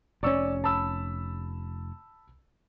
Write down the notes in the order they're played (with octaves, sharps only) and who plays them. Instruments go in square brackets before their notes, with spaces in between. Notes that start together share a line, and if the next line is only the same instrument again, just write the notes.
[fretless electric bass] F1 C#4 [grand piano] D5 C#6 E6
[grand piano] A5 B5 E6